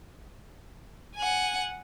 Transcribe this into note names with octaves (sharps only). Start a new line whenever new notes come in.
F#5 G#5